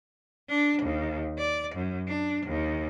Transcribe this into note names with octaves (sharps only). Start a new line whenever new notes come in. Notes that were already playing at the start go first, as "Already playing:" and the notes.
D4
D#2
D5
F#2
D4
D#2